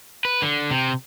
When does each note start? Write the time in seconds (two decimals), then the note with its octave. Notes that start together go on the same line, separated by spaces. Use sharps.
0.25 B4
0.42 D3
0.71 C3